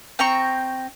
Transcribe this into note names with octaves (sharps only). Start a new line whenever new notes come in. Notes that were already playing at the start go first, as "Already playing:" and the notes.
C4 G5 A#5 C#6